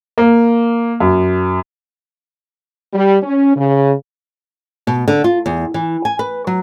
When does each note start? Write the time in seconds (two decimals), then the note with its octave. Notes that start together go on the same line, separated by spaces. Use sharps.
0.18 A#3
1.00 F#2
2.93 G3
3.23 C#4
3.56 C#3
4.87 B2
5.08 D3
5.24 F4
5.46 E2
5.74 E3
6.05 G#5
6.19 B4
6.47 F#3